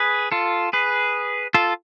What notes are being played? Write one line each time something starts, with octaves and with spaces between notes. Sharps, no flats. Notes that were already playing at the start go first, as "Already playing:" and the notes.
Already playing: G#4 B4
F4 A4
G#4 B4
F4 A4